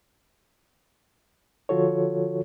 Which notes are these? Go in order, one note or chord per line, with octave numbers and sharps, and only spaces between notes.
D3 F3 F4 F#4 A4 C#5